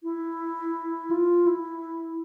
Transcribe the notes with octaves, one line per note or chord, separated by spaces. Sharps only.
E4
F4
E4